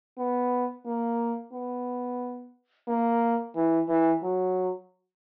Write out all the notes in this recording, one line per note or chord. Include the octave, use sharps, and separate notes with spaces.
B3
A#3
B3
A#3
E3
E3
F#3